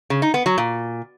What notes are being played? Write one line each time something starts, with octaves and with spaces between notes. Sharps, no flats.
C#3
D#4
B3
F#3
A#2